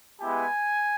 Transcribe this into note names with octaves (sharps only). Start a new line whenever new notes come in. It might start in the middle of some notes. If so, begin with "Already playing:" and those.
G#3 B3 E4 G4 G#5